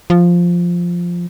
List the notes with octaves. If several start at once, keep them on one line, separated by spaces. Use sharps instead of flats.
F3